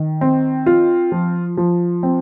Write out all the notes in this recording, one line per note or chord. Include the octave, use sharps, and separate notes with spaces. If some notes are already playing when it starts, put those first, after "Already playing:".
Already playing: D#3
C4
F4
F3
F3
C4